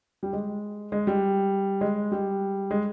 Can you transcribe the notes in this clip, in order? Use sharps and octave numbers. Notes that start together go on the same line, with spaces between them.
G3
G#3
G#3
G3
G#3
G3
G#3